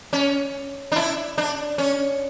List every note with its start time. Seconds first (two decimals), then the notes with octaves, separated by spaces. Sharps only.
0.13 C#4
0.92 D4
0.96 E4
1.38 D4
1.78 C#4